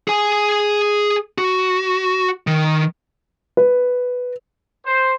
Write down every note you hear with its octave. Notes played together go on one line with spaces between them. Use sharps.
G#4 G#5
F#4
D#3
B4
C5